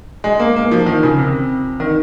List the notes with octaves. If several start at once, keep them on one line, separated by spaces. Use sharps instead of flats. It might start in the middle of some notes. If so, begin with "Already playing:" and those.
G#3
A#3
A#3
F3
D#3
C#3
C3
D#3